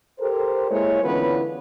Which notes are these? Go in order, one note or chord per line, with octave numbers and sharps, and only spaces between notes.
G4 A4 A#4 C5
G#3 A#3 E4 C#5
D3 E3 B3 C#4 F4 B4